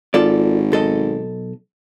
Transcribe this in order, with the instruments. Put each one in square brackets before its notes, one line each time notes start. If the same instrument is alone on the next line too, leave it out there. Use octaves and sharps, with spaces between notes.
[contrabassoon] G#1 [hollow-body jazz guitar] F4 A4 D5
[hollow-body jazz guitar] B1 A4 D#5